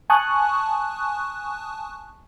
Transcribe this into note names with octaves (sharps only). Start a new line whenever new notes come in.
G#5 A5 C#6 D#6 F#6